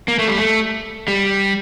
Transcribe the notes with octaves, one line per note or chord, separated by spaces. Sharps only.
A#3
A3
G3
A3
G3